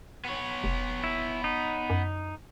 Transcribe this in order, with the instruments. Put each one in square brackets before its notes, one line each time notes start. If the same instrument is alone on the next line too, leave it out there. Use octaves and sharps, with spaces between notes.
[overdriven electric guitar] B3 C#5
[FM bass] F1
[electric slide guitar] E4
D#4
[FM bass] F#2